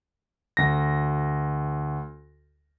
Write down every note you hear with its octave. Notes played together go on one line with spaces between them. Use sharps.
D2 A#6